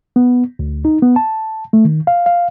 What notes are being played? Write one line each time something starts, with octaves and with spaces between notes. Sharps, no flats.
B3
D2
D#4
B3
A5
A3
D#3
F5
F5